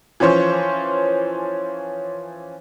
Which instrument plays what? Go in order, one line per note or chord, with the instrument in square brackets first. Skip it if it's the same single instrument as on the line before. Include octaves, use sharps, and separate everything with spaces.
[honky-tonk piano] E3 F3 C#4 C5 C#5